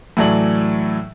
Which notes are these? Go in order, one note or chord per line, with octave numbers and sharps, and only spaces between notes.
A2 E3 F#3 A4 D5 F#7